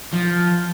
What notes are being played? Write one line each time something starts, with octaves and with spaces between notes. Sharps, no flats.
F3